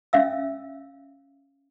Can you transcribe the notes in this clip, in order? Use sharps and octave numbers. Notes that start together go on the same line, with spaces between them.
C#4 E5 F5 E6